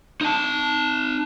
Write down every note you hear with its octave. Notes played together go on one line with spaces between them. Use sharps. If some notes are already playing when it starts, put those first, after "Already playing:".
D#4 A5